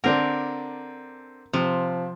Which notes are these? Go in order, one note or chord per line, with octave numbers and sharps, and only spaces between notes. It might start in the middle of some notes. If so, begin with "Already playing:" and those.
D3 C4 D4 A#4
C3 F3